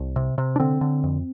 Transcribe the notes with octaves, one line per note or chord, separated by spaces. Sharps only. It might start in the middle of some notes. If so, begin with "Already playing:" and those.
Already playing: C2
C3
C3
D4
D3 C4
D3
F2